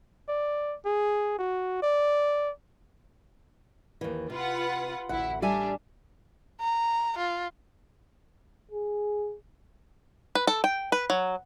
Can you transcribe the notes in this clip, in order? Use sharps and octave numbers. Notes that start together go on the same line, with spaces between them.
D5
G#4
F#4
D5
D#2 E3
C3 F4 B4 F#5
A1 D2 E4 F#5
G3 D4 E5 G#5
A#5
F4
G#4
B4
A4
G5
B4
F#3